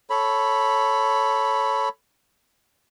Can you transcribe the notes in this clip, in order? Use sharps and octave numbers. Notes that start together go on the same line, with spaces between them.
A4 C#5 B5